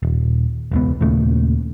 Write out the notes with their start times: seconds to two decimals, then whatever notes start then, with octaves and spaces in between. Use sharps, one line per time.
0.03 D#1
0.72 E1 C#2 B3
1.01 D#2 A#2 C#3 A3